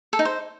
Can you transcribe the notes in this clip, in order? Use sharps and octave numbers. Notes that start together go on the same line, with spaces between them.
A4
D#4
C5